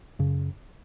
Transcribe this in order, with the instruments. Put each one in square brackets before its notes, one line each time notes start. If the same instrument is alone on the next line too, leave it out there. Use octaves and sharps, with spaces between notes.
[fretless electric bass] F#2 C#3